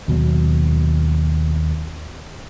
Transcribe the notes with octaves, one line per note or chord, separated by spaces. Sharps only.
D#2 B2 F#3